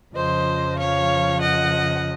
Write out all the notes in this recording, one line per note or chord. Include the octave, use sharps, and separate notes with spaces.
F2 C#3 F3 C5 D#5
C#5 F5
D#5 F#5